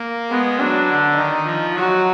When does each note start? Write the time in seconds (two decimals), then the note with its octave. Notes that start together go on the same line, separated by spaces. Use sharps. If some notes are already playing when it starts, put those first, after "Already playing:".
Already playing: A#3
0.30 G#3 B3
0.59 F#3 D4
0.88 D3
1.16 D#3 D#4
1.45 F3
1.74 F#3 F#4